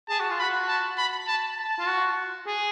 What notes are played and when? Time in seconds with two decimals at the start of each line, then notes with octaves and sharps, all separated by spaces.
0.09 G#4 A5
0.20 F#4
0.31 F4
0.39 F#4 B5
0.68 A5
0.98 B5
1.27 A5
1.58 A5
1.79 F4
1.87 F#4
2.47 G#4